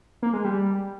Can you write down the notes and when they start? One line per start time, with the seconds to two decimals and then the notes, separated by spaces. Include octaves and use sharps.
0.23 A#3
0.33 G#3
0.44 G3